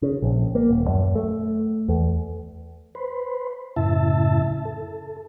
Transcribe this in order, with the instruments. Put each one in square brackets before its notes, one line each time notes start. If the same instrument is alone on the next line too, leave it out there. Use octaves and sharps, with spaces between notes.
[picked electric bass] C#3
A#1
A#3
D#1
F#2
A3
E2
[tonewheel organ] B4 C5
F#2 A2 C#3 E4 E5 A5
A4